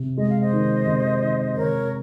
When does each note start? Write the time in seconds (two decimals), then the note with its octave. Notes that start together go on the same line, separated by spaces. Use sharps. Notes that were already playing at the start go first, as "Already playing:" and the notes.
Already playing: C3
0.17 G#3 D#5
0.29 F5
0.41 C5 D#5
0.53 D#3
0.87 C3
1.22 D#3
1.57 C3 A#4 C#5